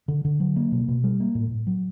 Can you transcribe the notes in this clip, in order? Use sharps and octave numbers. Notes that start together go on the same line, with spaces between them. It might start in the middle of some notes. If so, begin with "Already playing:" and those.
D3
D3
F#3
A#3
B2
B2
G3
A#3
A2
A2
F#3